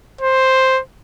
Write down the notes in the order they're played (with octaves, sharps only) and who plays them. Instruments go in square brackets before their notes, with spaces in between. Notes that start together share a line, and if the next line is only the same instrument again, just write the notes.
[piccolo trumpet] C5